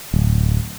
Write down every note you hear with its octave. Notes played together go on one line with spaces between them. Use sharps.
D1